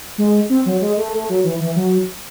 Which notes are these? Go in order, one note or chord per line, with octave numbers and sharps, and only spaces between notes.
G#3
C4
F#3
G#3
A3
A3
F#3
E3
E3
F#3